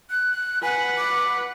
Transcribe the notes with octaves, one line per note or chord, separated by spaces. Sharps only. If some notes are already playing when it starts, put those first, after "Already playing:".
F#6
B4 F#5 G#5
D6